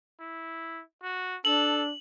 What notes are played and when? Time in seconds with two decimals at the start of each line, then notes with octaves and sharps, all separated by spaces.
0.20 E4
1.02 F#4
1.45 D4 A4 F#7